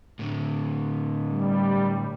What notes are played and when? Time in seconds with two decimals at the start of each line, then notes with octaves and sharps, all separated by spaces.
0.19 A2 D3
1.26 G3